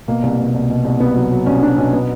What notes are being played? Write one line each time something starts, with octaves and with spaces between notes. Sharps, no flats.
B2 A#3
C2
B2
C2
B2
C2
C2 B3
F#3
F#3
C2 C#4
F#3 D4
B2 C#4
B3